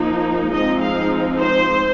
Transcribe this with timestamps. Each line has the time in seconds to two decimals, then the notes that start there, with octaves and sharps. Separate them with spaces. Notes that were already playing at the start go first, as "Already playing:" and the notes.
Already playing: F3 A#3 D#4
0.52 F3 G#3 C4 D#4 D#5
0.81 F5
1.39 C5